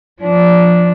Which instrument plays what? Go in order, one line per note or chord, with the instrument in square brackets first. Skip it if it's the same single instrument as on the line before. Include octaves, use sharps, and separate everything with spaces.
[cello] F3 D4